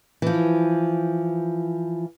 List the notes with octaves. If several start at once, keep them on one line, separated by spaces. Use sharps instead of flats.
E3 F3